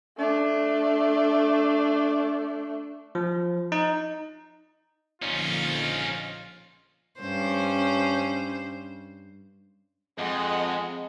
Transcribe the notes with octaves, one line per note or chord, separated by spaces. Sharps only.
A3 D4
F3
D#4
A#1 D3 F3 C#4 D#4 F4
G2 C#4 C5
F2 G#3 D#5 F#5